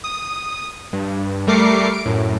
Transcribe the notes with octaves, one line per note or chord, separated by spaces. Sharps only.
D#6
G2
G3 A3 A#4 D6 C7 C#7
D7
F#2 A2